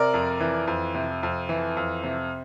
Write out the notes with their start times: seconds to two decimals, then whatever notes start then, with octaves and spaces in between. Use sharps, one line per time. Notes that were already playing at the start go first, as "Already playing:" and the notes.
Already playing: C3 A#4 D5
0.14 F2
0.40 E3
0.67 F2
0.95 C3
1.23 F2
1.49 E3
1.77 F2
2.04 C3